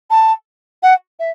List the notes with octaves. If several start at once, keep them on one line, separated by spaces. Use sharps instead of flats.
A5
F#5
E5